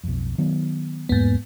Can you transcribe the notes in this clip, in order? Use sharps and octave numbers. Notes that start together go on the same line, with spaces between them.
B1 F2
D#3 F#3 B3
D1 E2 G#2 A#3 B3